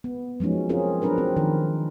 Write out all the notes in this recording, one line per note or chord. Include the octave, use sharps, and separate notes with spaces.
B3
F3 F#3 G#3 C#4 D#4
C4 C#4 F4 G#4 A#4
F#3 C4 D4 A#4 B4
C4
D#3 F3 A#4